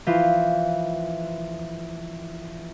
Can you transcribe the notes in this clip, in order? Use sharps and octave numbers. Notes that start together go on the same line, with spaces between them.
E3 F3 F4